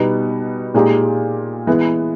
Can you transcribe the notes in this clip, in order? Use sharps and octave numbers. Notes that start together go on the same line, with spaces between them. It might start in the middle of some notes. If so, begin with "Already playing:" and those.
Already playing: B2 G3 B3 D#4
A#2 G#3 D#4 G4
E3 G#3 B3